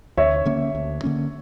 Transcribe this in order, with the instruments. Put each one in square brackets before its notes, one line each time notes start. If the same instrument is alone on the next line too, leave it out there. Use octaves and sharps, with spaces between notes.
[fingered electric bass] D2 [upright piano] C#5 E5
[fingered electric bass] D3 A#3 C#4
D2
D3 A#3 C#4